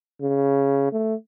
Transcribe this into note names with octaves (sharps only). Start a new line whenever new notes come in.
C#3
A3